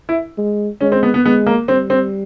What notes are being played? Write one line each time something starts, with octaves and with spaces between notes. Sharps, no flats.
E4
G#3
G#3 C#4
C4
B3
B3
G#3 B3
A#3
G3 C4
C4